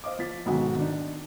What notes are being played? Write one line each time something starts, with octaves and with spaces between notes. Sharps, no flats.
C5 D#5 F5 D6
F3 A6 B6
B1 G#2 B2 D#3 F#3
D#3 D4 D#4